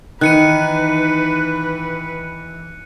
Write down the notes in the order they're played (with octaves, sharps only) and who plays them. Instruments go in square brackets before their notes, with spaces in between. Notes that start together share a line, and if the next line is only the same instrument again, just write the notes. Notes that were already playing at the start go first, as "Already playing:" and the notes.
[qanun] D#3 [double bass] E3 [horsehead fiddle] B4 [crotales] F#6 C#7 D#7